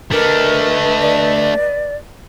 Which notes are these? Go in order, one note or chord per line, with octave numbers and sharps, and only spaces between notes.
A3 D4 A#4 B4 D#5
D5